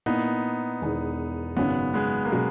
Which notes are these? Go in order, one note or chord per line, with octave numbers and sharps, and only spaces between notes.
A#2 A#3 B3 D#4 E4
E1 E2 D#3
G#1 F#2 C#3 F#3 G#3 B3 C#4
G#3 B3
A#3
B2 F#3 G#3 C#4 F#4